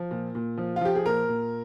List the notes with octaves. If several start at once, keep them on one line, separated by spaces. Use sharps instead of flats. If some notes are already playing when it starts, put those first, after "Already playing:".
Already playing: F3
A#2
A#2
F3
F4
F3 G4
G#4
A#2 A#4
A#2